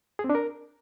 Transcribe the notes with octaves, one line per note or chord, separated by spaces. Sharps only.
G#4
C4
D4
A#4